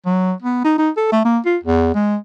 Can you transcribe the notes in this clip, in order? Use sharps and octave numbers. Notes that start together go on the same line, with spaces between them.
F#3
B3
D#4
D#4
A4
A3
A#3
F4
E2
G#3